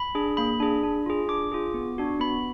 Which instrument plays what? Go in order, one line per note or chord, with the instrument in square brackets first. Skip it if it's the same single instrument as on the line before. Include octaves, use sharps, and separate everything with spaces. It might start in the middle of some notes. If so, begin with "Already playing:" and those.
Already playing: [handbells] B5
D4 G#4
A#3 B5
D4 G#4
D4
F4 G#4
D4 D6
F4 G#4
B3
D4 F#4
B3 B5